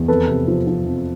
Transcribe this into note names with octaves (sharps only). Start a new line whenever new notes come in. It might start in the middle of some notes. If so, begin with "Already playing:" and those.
Already playing: E2
F2 A4 B4
C3
F3
F3
F2